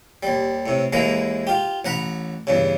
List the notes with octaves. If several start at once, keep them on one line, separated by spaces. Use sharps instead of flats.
D#2 G3
A2 C3
D#2 E3 G#3 A#3 A#5
F4 G4
A1 F#5 A#5 B5
E2 G2 C#3